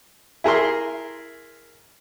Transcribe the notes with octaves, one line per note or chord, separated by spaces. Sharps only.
E4 G#4 A#4 C6